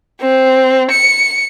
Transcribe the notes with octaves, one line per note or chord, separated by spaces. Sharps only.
C4
C#7